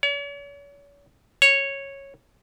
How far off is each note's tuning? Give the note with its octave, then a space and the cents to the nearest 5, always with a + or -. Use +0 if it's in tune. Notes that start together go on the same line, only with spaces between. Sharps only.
C#5 +40
C#5 -10